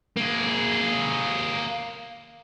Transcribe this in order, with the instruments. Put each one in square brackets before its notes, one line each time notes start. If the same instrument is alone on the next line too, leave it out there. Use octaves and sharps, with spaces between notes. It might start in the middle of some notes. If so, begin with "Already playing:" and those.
[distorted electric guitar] A#3 G#4